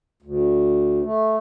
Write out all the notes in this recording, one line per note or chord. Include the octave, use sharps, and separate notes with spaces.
D2
A3